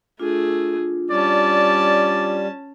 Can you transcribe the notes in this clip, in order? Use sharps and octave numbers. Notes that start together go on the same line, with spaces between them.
A3 D4 F4 G#4
G3 C#4 D5 A5